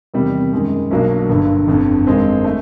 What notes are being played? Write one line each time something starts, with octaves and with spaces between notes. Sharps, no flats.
E2 C3 D#3 G3
F#2 D#3 G#3
B1 B2 F#3 A#3 D4
G1 G2 D3
G1 F2 D3
G2 D#3 G#3 C4
A3